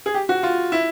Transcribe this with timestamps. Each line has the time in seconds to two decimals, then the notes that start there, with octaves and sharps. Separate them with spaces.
0.06 G#4
0.14 G4
0.29 F#4
0.43 F4
0.72 E4